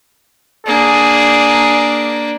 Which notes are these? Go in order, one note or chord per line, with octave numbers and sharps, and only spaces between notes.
A#3 D4 G#4